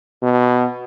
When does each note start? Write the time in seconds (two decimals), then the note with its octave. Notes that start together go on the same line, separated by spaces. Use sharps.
0.22 B2